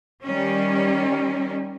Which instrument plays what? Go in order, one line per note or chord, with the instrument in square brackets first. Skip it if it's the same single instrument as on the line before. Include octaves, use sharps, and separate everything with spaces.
[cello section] D#3 G3 C#4